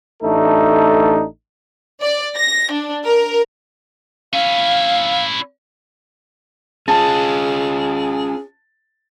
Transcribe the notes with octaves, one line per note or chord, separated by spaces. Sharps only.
A1 A3 D4 D#4 A4
D5
A#6
D4
A#4
C#4 E4 F5
C#4 F4 G#4 A5